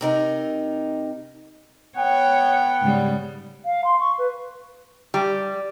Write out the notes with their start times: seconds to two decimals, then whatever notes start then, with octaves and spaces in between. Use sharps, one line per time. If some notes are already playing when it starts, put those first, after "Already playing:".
0.01 C3 D#4 A#4
1.96 B3 C#5 F#5 G5
2.81 G#2 C#3 G3
3.65 F5
3.85 C6
4.00 C#6
4.18 B4
5.14 G3